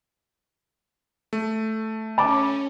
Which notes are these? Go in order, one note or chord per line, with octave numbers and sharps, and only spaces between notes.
A3
C#4 A5 D6